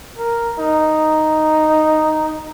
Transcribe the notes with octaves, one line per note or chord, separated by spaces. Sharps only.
A#4
D#4